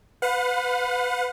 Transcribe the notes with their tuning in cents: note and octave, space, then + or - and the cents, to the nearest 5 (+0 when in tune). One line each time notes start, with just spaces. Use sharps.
B4 +25 F#5 -45